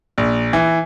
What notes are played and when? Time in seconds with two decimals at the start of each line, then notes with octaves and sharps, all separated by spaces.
0.18 A#1
0.53 E3